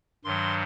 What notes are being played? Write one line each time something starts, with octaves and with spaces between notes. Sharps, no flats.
G2 D#3 F#3 C6